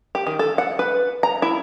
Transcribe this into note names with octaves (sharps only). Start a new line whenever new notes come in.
G4
D#3
A4
F#5
B4
A#5
E4